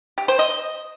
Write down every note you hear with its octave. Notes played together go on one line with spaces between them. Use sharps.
G4
C5
D#5